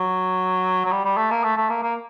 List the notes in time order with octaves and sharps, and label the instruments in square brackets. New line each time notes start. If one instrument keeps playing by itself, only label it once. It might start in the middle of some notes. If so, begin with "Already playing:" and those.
Already playing: [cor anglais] F#3
F#3
G3
G3
A3
A#3
A3
A3
A#3
A#3